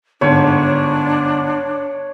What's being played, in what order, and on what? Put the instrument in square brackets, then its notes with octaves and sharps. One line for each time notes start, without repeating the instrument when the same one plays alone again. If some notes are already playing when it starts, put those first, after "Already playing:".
[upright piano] G1 G#2 [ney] D4 [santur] C#5